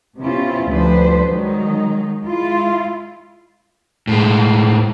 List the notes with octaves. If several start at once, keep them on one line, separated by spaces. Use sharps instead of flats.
C3 B3 C#4 E4 F4
D2 F3 G3 D4 B4 C5
D#3 F#3 G#3 D#4
G#3 E4 F4
A2 G#3